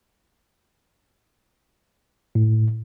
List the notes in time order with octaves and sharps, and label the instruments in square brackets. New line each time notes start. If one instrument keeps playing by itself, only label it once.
[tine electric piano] A2